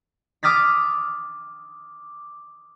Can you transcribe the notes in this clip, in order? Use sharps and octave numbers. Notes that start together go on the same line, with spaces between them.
D6 D#6 F6 A6 B6